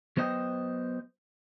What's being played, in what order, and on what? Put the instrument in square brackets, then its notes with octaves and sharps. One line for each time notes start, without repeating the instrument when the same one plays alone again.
[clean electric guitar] F#3 B3 C5 D#5 G5